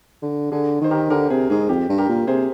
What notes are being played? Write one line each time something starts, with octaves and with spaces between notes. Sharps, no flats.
D3
D3 G#4
D#3 C5
G4 A#4
D3 G4 A#4
C3 G#4
G#2 G#4
F2 G4
G2
G4 A#4
A#2
C3 G#4 C5